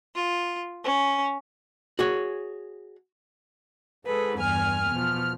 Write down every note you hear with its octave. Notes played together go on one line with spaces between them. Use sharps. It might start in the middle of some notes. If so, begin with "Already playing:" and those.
F4
C#4
F#4 G#4 C#5
G#2 G#4 A4 B4
E2 G2 G#5 F6
B2 F3